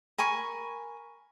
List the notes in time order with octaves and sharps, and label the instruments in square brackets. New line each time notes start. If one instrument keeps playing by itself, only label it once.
[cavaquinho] A#4 G#5 B5 C#6